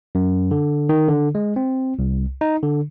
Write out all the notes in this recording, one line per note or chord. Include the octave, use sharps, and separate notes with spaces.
F#2
D3
D#3
D3
G#3
C4
C2
D#4
D3